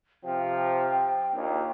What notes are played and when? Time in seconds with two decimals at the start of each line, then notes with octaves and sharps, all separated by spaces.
0.24 C3 F3 G5
1.32 A#1 D#2